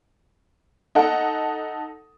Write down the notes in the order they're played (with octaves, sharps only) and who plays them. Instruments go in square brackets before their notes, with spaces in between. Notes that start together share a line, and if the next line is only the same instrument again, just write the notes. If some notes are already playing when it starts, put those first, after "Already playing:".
[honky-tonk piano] D#4 A4 F#5